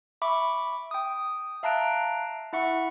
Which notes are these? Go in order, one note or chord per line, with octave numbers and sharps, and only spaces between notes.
E5 B5 C#6 D6
G5 D#6
E5 F5 A5 A#5 F#6 D7
E4 E5 F#5 C#6